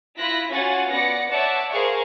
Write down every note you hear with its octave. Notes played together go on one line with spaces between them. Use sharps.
E4 F4 F#6 A#6 B6
C#4 F4 F#4 F#5 G#5 A6
B3 D5 F#5 A#6 C#7
C#5 D5 E5 F#5 A5
G#4 A#4 C5 F5 C#6